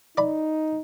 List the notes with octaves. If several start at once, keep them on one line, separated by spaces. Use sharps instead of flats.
D#4 D5 B5